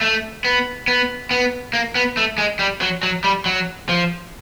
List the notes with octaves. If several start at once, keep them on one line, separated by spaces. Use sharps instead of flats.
A3
B3
B3
B3
A#3
B3
A3
G#3
G3
F#3
F#3
G3
F#3
F3